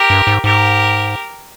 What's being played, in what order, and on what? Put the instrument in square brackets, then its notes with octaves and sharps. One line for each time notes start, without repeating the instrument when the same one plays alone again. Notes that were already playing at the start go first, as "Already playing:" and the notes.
Already playing: [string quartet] G4 A#4
[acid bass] G2
G#2
[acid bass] G#2 [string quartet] G4 A#4